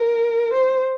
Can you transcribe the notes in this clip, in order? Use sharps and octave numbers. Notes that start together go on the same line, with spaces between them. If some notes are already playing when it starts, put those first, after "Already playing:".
Already playing: A#4
C5